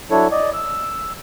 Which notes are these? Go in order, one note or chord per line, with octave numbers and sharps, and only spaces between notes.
F#3 D4 E4 A4 C#5
D5 D#5
E6